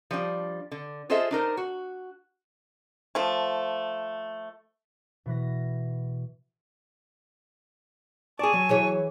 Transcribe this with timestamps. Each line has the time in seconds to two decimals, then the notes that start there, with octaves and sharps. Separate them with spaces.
0.11 F3 G3 D4
0.71 D3
1.10 F4 G#4 A4 C5 D#5 E5
1.31 D4 D#4 A#4 C5
1.57 F#4
3.15 F3 A3
5.26 B2 E3 B4 A#6
8.39 G#4 D5 G#5 A5 C#6
8.54 F#3
8.69 E3 G#4 C#5